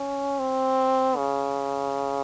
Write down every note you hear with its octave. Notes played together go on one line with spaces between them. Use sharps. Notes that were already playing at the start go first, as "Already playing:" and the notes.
Already playing: C#4
C4
C#3